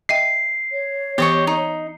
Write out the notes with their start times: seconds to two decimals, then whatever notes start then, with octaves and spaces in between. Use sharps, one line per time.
0.09 D#5 E5 G5 C7
0.72 C#5
1.18 E3 B3 G4 D#5 C#6
1.47 D#4